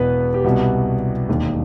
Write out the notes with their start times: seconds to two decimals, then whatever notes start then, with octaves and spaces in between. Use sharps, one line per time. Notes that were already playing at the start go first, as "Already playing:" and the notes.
Already playing: E1 E2 B2 B3 B4
0.34 G4
0.44 C2 B2 G3 B3 F#4
1.28 E1 D#2 D#3